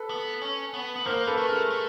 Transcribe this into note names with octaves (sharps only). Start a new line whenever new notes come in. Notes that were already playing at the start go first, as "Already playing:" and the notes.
Already playing: A4 B4
B3
C#4
B3
B3
A#3 A#4 C5
A4 B4
A3
G#4 A#4
A3